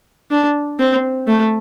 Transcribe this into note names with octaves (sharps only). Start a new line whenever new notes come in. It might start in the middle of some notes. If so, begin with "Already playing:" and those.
D4
C4
A3